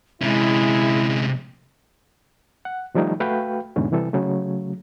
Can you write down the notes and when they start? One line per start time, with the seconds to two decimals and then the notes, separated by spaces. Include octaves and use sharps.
0.21 C3 G#3 C#4 E4
2.65 F#5
2.95 D#3 F3 G3 A3 D#4
3.20 A3 F#4 B4 F5 G5
3.76 E2 G#2 B2 D3 E3 C#4
3.92 C3 E3 G3 A4
4.13 C#3 F#3 A3